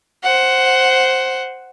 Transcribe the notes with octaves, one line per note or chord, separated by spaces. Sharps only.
C5 F#5